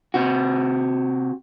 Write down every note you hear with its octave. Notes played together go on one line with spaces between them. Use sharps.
C3 F#4